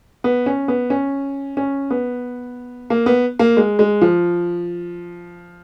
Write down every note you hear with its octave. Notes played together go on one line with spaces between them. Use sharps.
B3
C#4
B3
C#4
C#4
B3
A#3
B3
A#3
G#3
G#3
F3